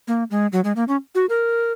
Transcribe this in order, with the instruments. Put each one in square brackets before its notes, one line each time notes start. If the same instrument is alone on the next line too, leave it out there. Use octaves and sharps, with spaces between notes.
[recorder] A#3
G#3
F#3
G#3
A#3
C#4
F#4
A#4